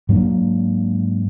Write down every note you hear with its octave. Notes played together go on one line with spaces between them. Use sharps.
G#2 F#3 A#3 D4